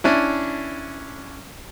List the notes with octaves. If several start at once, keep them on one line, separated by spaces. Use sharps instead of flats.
C#4 D4 E4